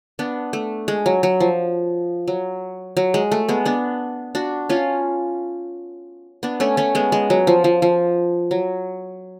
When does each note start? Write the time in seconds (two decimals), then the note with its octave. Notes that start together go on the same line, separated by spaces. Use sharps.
0.19 B3 D4
0.53 A3
0.88 G#3
1.06 F#3
1.23 F#3
1.40 F3
2.28 F#3
2.97 F#3
3.14 G#3
3.32 A3
3.49 G#3 B3
3.65 B3 D4
4.35 D4 F#4
4.69 C#4 F4
6.43 B3 D4
6.60 A3 C#4
6.77 A3 C#4
6.95 G#3 B3
7.12 G#3
7.30 F#3
7.47 F3
7.64 F3
7.82 F3
8.51 F#3